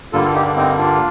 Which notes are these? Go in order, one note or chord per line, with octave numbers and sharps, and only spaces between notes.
G2 D3 G3 A#3 F4 A4
F4 A4
D#4 G4
D4
C4 D#4
D4 F4